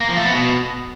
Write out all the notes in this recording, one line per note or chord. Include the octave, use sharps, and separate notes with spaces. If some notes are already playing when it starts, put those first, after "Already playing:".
A#3
F3
A3
B3
B2